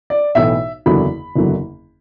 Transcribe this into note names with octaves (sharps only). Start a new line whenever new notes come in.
D5
B1 A2 E3 A3 E5
F#1 E2 D3 F#3 B5
F#1 E2 D3 F#3